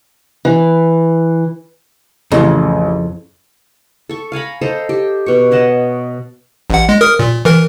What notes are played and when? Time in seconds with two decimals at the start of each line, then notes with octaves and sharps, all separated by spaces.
0.45 E3
2.32 A1 F2 C#3
4.09 A4 C#6
4.32 F5 G#5 A#5 B5
4.61 A4 C5 D#5 A#5
4.89 G4
5.26 B2 C#6
5.51 C#5 D#5 F#5 A5
6.70 A1 F#5
6.89 G#3
7.01 A#4 D#6 F6
7.19 A#2
7.45 E3 A#4